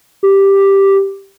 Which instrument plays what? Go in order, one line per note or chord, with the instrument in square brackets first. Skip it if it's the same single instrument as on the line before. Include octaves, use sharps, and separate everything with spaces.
[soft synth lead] G4